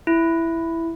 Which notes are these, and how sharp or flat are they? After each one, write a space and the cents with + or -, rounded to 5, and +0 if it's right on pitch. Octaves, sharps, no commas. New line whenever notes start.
E4 +5